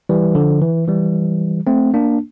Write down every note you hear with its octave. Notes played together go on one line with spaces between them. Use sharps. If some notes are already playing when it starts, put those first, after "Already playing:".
E3 G3
D3 F3
E3
E3 G3
A3 C4
A#3 D4